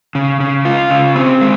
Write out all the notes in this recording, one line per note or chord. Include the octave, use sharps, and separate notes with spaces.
C#3
C#3
F4
C#3
C4
G#3